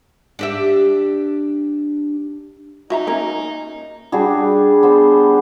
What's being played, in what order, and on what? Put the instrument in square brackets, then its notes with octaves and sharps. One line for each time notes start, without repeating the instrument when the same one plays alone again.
[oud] D4 G4 E5
[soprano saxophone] D#4 [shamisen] F#4 E5 A#5
[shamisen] A#3 C#4 A#4
[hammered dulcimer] G3 D4 F#4 G#4
B3 C5